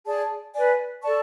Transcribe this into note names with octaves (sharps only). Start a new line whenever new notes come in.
G#4 D5 A5
B4 D5 G#5
A4 D5 A5 C#6